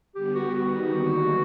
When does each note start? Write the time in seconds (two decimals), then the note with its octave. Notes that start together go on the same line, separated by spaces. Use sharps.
0.15 D3 G3 B3 G4
0.35 F#4
0.55 D#3 G3 B3 D#4 F#4 G4
0.96 D3 F#3 A#3 D#4